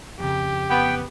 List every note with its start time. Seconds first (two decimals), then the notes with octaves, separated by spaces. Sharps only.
0.20 F2 C#3 G4
0.70 B3 G5